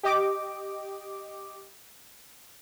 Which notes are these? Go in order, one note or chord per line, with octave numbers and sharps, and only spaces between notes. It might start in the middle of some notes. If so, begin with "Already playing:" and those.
G4 D#5 D6